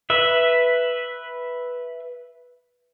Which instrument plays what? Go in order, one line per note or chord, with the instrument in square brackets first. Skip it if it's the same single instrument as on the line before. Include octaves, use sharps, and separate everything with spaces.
[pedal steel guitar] B4 E5